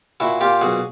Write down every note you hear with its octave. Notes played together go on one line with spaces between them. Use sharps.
A#2 E4 F#4
A#2 F4 G4
B1 F#4 G#4